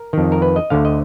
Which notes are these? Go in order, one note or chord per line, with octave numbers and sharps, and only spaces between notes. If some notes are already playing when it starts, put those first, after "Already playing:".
Already playing: A#4
F2 D#3
A#4
B4
D#5
D2 D3 F5
D#5